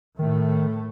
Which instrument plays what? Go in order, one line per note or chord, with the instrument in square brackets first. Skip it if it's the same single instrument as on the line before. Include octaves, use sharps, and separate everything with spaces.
[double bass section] A2 A3 [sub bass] D#3